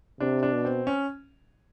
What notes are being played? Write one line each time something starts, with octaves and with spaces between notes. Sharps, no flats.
C3 D4
D4
B2
C4
C#4